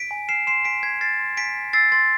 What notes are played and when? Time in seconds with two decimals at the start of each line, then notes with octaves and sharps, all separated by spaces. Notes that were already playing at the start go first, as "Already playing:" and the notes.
Already playing: B6 D7
0.11 G#5
0.29 F6 C7 E7
0.47 C6 C7 E7
0.65 G#5 B6 D7
0.83 G#5 G#6 B6
1.01 F6 A6 C7
1.19 C6
1.37 G#5 B6 D7
1.55 G#5
1.73 E6 A6 C7
1.92 C6 A6